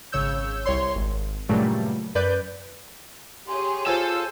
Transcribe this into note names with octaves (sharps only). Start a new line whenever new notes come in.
G#1 C#3 C#5 E6 G6
C2 C#5 C6
G#1
G2 A#2 C#3 F#3 G3 A3
F#2 B4 D5 G6
G4 G#4 C#5 C6
F4 A4 C5 G#5 A5 E6